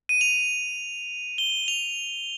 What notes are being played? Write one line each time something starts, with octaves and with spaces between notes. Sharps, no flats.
D#7
F7
G7
F7